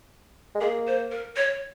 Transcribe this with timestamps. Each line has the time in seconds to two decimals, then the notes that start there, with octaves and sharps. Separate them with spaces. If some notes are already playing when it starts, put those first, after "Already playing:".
0.55 G#3
0.61 A#3 G#4
0.87 C5
1.11 A#4
1.37 C#5